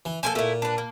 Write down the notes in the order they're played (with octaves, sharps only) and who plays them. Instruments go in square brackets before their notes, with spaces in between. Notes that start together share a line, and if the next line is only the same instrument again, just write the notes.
[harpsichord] E3
[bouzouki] F3 A#3 A4 [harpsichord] G#5
[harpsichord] A#2 [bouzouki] A3 E4
[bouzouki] D4 B4
A#3